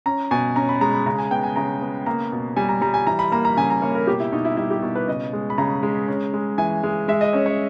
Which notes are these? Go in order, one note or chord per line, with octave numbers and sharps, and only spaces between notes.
C#4 A#5
B2 G#5
C#4 A#5
B5
G#3 A#5
B5
C#3 A#5
G#5
B3 G5
G#5
C#3 A#5
B3
A#3 A#5
B2
G3 G#5
A#5
G3 A#5
G#5
E3 A#5
B5
A#3 A#5
A#5
C#3 G#5
A#5
A#3 C#5
A#4
B2 G4
E4
B2 D#4
E4
G3 E4
G4
B2
B4
C#3 D#5
G#3
B5
C#3 A#5
G#3
C#4
G#3
E3 G#5
G#3
G#3 E5
D#5
C#4 C#5
C#5